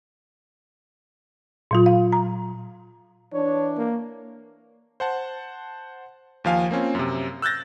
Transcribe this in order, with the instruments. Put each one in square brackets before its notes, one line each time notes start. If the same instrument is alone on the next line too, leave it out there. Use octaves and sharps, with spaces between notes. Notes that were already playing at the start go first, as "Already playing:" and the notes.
[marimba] A#2 F#3 F4
F5
A#5
[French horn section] E3 D4 [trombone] C#5
[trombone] A#3
[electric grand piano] C5 F#5 A5
D#2 F3 F5 G#5
A#3 C4 C#4 F4
F#2 C3
E6 F#6 G6 A6 A#6